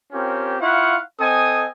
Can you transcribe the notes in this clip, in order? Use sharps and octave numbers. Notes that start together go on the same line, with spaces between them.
C4 C#4 F4 G4 A#4
E4 F4 F5 F#5 C#6
C4 A4 D#5 G#5 D#6